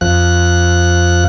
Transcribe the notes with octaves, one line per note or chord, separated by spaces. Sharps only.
F2 F3 F#6